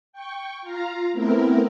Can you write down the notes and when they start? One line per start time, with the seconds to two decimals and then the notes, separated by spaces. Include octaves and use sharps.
0.13 G5 C#6
0.62 F4 F5 A#5
1.13 A3 B3 C4 E4 A#4